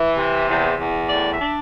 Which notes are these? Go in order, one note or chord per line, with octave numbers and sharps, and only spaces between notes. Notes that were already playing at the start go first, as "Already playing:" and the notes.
Already playing: E3
C3
E2
E2
A2 D5
E5
D4